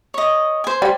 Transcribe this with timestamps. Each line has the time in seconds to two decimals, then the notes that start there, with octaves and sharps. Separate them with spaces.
0.14 C#5 D#5
0.64 C5 G#5
0.82 G3